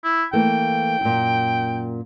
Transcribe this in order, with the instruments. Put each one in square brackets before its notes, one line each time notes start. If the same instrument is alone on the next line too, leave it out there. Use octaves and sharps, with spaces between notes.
[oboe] E4
[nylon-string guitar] E3 A3 A#3 [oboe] G5
[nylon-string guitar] F#2 A#2